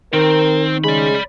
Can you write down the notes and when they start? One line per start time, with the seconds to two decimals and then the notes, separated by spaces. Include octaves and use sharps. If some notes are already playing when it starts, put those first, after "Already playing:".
0.13 D#3 C4 A#4
0.84 C#3 G#3 D5 B5